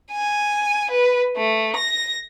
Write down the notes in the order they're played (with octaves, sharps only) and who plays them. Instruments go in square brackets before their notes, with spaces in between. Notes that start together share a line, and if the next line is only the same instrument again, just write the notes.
[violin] G#5
B4
A3
A#6